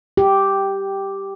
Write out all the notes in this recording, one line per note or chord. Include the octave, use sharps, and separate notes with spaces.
G4